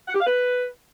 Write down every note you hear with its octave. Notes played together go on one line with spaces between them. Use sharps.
F#5
G4
F5
B4